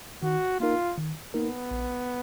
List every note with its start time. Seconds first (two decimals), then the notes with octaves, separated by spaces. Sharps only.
0.23 D#3 F#4
0.60 A#3 D#4 F4 A#4
0.97 D#3
1.34 A#3 B3 D#4 A#4
1.71 A#1